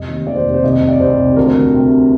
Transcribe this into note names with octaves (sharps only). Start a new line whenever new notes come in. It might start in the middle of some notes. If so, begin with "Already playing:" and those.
Already playing: F1 D#5
D#2
D#3 D5
C5
F1
C5
C2 D#5
C2
D5
C2 C5
C2
D2 A#4
D2
C3